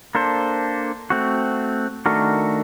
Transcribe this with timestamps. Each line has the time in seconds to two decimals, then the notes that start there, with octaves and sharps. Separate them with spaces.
0.15 A#3 D4 A4 C5
1.10 A3 C4 F#4
2.06 D#3 A3 D4 F#4 A#4